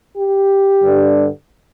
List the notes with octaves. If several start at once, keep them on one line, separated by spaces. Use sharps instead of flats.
G4
G2 D3 G3 D4